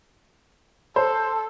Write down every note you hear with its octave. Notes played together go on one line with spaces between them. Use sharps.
A4 C5